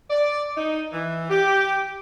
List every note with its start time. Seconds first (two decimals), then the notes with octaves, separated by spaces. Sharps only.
0.10 D5
0.56 D#4
0.92 E3
1.30 G4